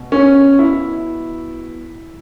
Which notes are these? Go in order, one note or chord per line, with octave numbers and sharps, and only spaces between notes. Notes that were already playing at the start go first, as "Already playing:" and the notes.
Already playing: B2
C#4
E4